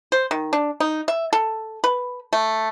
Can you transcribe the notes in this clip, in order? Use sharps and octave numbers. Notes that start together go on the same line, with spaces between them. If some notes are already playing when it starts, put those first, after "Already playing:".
C5
D#3
D4
D#4
E5
A4
B4
A3